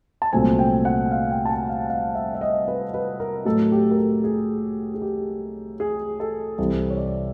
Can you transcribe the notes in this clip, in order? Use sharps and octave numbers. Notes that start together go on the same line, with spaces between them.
A5
C2 A#2 F#3 A3 C4 G#5
G5
F#5
F5
G5
A5
G#5
F5
F5
E5
E5
D#5
B4
B4
A#4
A2 F#3 A3 A4
G4
A#4
A4
G#4
G#4
G4
G#4
A4
C2 C3 E3 A4
C#5
D5